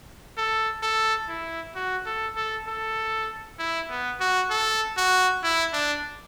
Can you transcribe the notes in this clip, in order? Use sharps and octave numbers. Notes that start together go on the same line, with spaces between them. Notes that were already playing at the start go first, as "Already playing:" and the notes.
A4
A4
E4
F#4
A4
A4
A4
E4
B3
F#4
A4
F#4
E4
D4